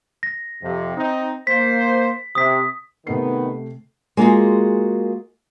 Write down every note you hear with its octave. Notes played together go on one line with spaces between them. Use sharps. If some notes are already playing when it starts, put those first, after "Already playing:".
A#6
F2 C3
C4 D#4
A#3 C5 B6
C3 D#6 B6
C3 D#3 A3 B3 C7
G#3 A#3 F4 F#4 G#4